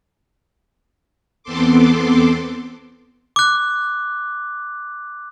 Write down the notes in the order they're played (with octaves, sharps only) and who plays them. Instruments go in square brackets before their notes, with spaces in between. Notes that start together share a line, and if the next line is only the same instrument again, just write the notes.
[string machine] E2 B3 C4 A4 C6 D6
[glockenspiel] D6 F#6